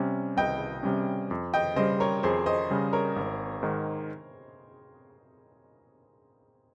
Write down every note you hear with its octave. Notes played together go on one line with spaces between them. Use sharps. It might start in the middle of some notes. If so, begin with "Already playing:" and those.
Already playing: C3 G3 C#4
C2 D#5 G5
C3 G3 C#4
F2
D#5 G5
C#3 G3 C5 D#5
A#4 C#5
F2 G#4 C5
C5 D#5
C#3 G3
A#4 C#5
G#1
G#2 D#3